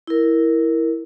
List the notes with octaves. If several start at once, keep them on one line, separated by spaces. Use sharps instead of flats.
E4 A#4